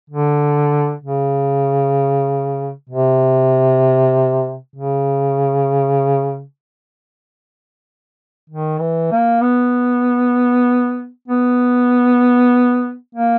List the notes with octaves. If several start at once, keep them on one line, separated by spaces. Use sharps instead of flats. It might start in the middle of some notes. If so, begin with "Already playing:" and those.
D3
C#3
C3
C#3
D#3
E3
A#3
B3
B3
A#3